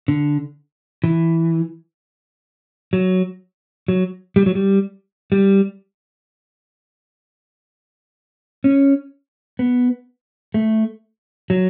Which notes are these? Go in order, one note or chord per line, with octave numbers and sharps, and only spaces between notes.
D3
E3
F#3
F#3
G3
F#3
G3
G3
C#4
B3
A3
F#3